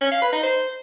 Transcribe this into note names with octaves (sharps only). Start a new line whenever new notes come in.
C#4
F5
B4
D#4
C5